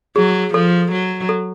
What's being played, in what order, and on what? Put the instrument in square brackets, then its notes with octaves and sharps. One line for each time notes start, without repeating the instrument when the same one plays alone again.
[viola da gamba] F#3 [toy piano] G#4
[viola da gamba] F3 [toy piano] A4
[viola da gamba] F#3
[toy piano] A4